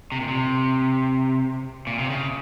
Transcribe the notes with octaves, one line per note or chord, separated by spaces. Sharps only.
C3
A#2
C3
A#2
C3
C#3